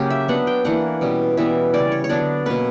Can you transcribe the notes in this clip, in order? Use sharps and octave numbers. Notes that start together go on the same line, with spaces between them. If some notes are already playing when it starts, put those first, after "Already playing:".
Already playing: C#3 F#3 A#3 C#4 G4
E5
F#3 B3 D4 F#5
G5
E3 A#3 D4 F#5
B2 G3 C#4
E3 G3 B3 E5
C#3 G3 C#4 D5
C#5
C#5
D3 F#3 B3 D4 D5
B2 A#3 C#4 B4